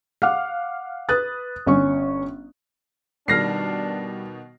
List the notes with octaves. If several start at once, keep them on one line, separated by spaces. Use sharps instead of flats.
F5 F#5 D6 F6
B4 D#6 F#6 A6
G1 C#4 C#6
B2 D#3 G3 D4 F6 A#6 C7